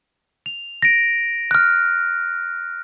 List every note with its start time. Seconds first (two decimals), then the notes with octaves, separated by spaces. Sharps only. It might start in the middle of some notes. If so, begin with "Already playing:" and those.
0.46 F7
0.82 A#6 D7
1.51 F6 F#6